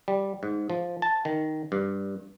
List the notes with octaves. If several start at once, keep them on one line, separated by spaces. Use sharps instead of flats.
G3
G#2
F3
A5
D#3
G2